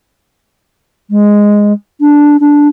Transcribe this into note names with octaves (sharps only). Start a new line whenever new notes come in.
G#3
D4
D4